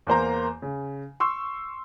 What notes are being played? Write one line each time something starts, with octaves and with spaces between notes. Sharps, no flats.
E2 A#3 C5 A#5
C#3
C6 C#6 E6